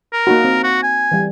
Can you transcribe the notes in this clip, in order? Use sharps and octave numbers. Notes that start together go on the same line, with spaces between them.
A#4
A#3 D#4 F#4
C4
F#4
G#5
E3 G3